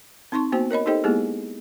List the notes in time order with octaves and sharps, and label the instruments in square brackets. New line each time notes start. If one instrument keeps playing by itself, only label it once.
[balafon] C4 D#4 A5 C6 C#6
A#3 B3 F#4 C5 G5
A#4 C#5 D#5 B5
D#4 G4 A4 C5 D#5 G5
G#3 A#3 B3 E4 G4 G#4